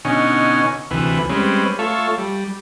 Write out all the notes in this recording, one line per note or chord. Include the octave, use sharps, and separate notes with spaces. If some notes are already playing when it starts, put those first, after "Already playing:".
B2 D3 C#4 D#4 G#5 C#6
D2 C3 E3 B4
G3 G#3 C4 C#4 B4
A3 F4 A4 C#5 E5
G3